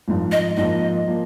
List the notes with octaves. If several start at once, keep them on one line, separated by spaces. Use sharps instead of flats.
G#1 G#2 F3
D#5
G#2 F3 A#3 D#5
F3 A#3